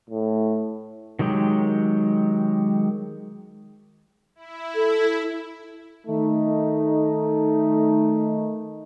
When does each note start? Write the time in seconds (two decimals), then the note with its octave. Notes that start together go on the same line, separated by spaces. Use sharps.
0.10 A2
1.19 D#3 F#3 G#3 G4
4.35 E4
4.75 A4
6.07 D#3 A3 D#4